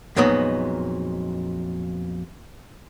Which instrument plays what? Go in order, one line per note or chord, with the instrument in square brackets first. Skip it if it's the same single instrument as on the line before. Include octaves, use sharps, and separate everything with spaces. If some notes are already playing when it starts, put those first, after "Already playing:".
[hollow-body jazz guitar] F2 A#2 F#3 G#3 B3 D#4